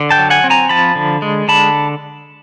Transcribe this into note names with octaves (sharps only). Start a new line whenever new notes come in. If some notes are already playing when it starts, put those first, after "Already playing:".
Already playing: D3
G5 A5
F#3
F#5 G#5
C4
G#5 A#5
F3 A5 B5
D3
G#3
D3 A5 B5